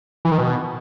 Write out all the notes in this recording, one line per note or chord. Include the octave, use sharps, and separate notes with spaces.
E3
D#3
B2